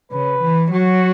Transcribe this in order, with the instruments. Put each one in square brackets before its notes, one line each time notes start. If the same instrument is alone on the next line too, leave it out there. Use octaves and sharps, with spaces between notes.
[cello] C#3 [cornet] B4
[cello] E3
[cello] F#3 [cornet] F#4